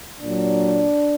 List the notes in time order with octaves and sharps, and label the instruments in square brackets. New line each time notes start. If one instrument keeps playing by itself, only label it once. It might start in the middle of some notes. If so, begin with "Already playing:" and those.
[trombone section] A#2 F#3 D4